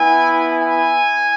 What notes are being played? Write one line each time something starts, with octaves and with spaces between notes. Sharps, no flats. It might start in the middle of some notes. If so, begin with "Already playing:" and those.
Already playing: B3 E4 G#5
G#5